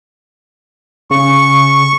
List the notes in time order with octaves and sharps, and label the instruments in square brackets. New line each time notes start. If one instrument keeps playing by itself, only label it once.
[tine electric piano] C#3 [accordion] C#6